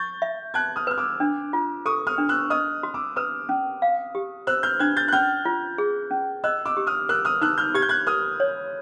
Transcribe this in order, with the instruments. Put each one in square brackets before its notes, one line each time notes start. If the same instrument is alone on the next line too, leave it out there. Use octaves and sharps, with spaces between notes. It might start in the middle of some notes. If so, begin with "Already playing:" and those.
Already playing: [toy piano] C#6 [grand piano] G6 A6
[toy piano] E5
[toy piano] A5 [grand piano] F#6 G#6
[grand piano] D#6 F6
[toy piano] B4 [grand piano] F6
[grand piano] D6 E6
[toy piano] D4
F4
[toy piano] A4 [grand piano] C#6 D#6
[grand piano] D#6 F6
[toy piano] D4
[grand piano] E6 F#6
[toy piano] D#5 [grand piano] D#6 F6
[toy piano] F#4
[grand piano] D6 E6
[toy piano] B4 [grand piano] D#6 F6
[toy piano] C#4
F5
G4
[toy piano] C5 [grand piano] E6 F#6
[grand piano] F6 G6
[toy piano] D4 [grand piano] F#6 G#6
[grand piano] G6 A6
F#6
[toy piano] C#4 [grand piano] F6 G6
[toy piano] F4
G#4
C#4
[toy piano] D#5 [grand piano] E6 F#6
[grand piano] D6 E6
[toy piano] G4
[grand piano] D#6 F6
[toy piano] A#4 [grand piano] E6 F#6
[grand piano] D#6 F6
[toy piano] D#4 [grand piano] E6 F#6
[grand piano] F6 G6
[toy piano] G4 [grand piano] G#6
[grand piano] G6
F#6 G#6
[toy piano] A#4 [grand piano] D#6 F6
[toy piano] C#5